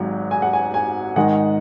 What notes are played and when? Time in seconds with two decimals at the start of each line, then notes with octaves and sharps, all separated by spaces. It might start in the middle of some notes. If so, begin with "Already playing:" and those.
Already playing: G#1 G#2 F#3
0.31 G#5
0.42 F#5
0.53 G#5
0.74 G#5
1.16 G#2 D#3 G#3 D#4 F#5